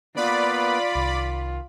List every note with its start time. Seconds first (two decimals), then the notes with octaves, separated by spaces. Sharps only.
0.17 A#3 B3 F4 B4 D5 B5
0.95 C2 D#3